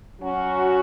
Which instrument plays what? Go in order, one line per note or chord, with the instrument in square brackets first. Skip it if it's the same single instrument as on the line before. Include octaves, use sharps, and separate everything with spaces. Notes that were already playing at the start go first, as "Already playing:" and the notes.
[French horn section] F#3 C#4 F#4